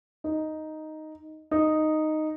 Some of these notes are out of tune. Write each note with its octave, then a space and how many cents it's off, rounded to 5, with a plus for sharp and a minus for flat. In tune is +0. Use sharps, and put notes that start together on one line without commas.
D#4 +0
D#4 -5